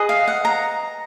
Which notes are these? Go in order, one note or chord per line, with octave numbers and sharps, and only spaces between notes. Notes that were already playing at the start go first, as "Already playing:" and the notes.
Already playing: G#4 B4 D#5
F5
F#5
A#5